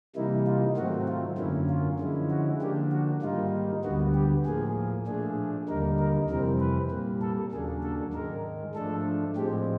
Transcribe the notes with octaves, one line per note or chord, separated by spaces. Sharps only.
C3 E3 G3 A#3 D#4 E4
F4
G#2 D#3 F#3 A3 C4 F#4
F4
F#2 D3 F#3 A#3 C#4 E4
F4
D3 F3 G#3 C#4 E4
F#4
D3 F3 A#3 D4 G4
F#4
G#2 D#3 G3 A#3 D#4 F4
D2 D3 G3 B3 F#4
G4
A2 F3 A#3 G#4
A#2 F3 A3 D4 G#4
D#2 D3 G3 A#3 D#4 A#4
A#4
F2 C3 E3 G3 C4 A#4
B4
A#2 G3 A#3
A4
D#2 C#3 F#3 A#3 D4 G#4
A4
G#2 D#3 G#3 A#4
G#2 F3 A3 D4 A4
A2 F3 G#3 C4 G4